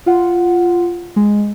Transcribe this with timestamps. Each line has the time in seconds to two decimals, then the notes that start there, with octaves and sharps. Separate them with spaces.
0.06 F4 F#5
1.16 G#3